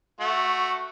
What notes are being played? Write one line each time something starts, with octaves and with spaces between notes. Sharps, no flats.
A3 F#4